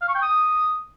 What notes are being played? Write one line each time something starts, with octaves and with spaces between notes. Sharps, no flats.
F5
C#6
G5
D#6